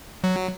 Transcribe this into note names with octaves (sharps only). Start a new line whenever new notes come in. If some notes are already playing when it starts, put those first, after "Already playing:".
F#3